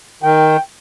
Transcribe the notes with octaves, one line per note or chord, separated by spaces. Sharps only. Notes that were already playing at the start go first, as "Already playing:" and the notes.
D#3 G5